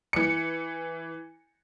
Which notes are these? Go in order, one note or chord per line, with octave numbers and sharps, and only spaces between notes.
E3 C#7